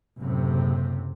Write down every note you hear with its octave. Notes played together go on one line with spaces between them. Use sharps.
F#1 A2 C3